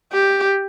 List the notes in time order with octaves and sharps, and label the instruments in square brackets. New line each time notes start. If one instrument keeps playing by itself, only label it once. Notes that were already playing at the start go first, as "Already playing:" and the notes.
[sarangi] G4